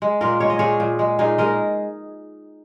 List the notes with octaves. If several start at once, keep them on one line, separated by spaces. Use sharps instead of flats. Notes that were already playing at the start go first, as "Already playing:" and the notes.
G#3
A#2 F4 A#4
G#3 C#5
D#5
A#2 G#4 C#5
A#2
G#3
A#2 D#4 G#4
G#3 A#4 D#5